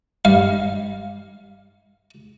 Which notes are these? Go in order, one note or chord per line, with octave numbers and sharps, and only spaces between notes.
G2 F5